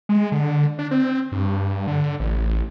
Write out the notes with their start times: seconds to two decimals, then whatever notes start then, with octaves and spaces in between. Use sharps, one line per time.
0.09 G#3
0.32 D3
0.79 D4
0.91 C4
1.32 G2
1.87 D3
2.20 A1